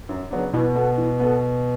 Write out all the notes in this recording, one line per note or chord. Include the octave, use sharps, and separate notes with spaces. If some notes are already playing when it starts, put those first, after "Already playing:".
F#2
C#3 F#3 B3 D4
B2 E3
B3 F#4 A4
E3
B3 F#4 A4